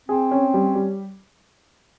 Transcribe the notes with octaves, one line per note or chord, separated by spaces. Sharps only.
C4 G#4
C#4
G3
G3